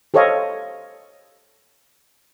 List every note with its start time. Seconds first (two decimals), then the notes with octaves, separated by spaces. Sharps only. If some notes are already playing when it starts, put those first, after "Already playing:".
0.14 G4 A4 C5 C#5 D#5 F5